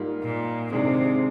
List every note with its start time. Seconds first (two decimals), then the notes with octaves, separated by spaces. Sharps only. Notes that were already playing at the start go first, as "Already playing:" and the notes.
Already playing: G#2 G3 A#3 F4
0.25 A#2
0.71 G#2 C3 D#3 G#3 D4 G#4